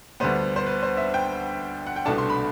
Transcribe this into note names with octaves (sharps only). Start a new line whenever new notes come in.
D2 D3 G3 B3 C5
C5
B4
C5
E5
G5
F#5
G5
C2 B2 A3 D4 A5
C6
B5